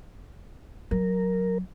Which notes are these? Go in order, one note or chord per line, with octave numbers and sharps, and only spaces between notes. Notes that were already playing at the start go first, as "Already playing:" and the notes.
F#3 A#4